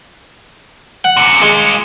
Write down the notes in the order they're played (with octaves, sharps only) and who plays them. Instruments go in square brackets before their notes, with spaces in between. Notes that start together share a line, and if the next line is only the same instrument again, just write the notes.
[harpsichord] F#5
[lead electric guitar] F#2 C3 [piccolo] C#7
[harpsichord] G#3 [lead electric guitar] F4 G#4